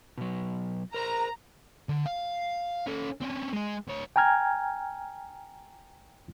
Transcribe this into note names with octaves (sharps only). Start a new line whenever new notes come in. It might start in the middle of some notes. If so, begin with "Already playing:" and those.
B2 F#3
A#4 C5 A#5
D3
F5
C#4 A4
C4 C#4
G#3 G#4
D2 C#5
G5 G#5 A#5 F6 G#6